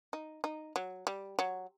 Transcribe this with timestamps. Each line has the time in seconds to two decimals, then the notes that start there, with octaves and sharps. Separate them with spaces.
0.13 D#4
0.44 D#4
0.76 F#3
1.07 G3
1.39 F#3